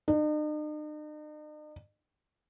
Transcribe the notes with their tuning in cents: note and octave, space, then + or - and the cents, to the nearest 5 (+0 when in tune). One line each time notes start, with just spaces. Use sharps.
D#4 -45